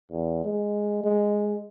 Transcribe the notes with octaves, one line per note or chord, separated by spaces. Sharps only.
E2
G#3
G#3